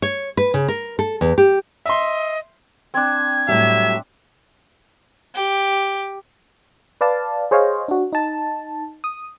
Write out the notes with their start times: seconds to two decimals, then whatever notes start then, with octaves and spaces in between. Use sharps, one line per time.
0.02 C#5
0.37 B4
0.54 C#3
0.68 A#4
0.99 A4
1.21 E2
1.38 G4
1.86 D#5 E5 C6
2.94 C4 D4 G#6
3.48 A2 F#3 G3 E5
5.36 G4
7.01 B4 D5 F5 A5
7.51 G#4 C5 C#5 D#5 F5
7.88 D4 F#4
8.13 D#4 A5
9.04 D#6